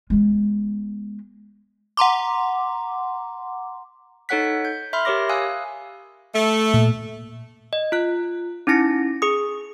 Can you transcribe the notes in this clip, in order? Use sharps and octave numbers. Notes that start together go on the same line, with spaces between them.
G#3 B3
F#5 A#5 C6 D6
D#4 A4 C#5 F#5 F#6 B6
G6
E5 B5 C6 F6
G4 A#4 C#5 D6 A#6
F5 G#5 D#6 E6 F#6
A3
A#2
D#5
F4 F#6
C#4 D#4 E4 A#6 C#7
G#4 D#6